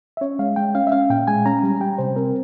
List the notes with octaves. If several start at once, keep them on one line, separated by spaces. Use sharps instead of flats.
E5
C#4 C#5
G#3 F5
G#3 G5
C#4 F5
E5
C#4 F5
A#2 G5
G#3 G#5
C#4 A#5
G3
G3 G5
C3 C5
C4 A#4